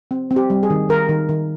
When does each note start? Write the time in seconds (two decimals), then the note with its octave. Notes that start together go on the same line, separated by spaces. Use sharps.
0.11 C4
0.31 C4
0.36 G4
0.50 G3
0.63 G#4
0.70 D#3
0.89 D#3 A#4
1.09 D#3
1.29 D#3